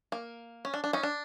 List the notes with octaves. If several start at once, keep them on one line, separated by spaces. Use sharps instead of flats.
A#3
C#4
D4
D4
C#4 D#4
D4